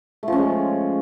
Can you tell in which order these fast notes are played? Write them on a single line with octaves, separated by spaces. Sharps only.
A3 F3 C#4 G#3